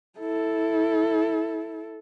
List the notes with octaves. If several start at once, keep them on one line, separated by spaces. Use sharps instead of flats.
E4 A4